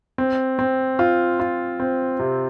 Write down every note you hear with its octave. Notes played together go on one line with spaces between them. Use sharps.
C4
C4
F4
F4
C4
C3